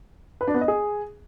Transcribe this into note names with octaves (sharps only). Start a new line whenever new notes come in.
B4
D4
B3
D#5
G#4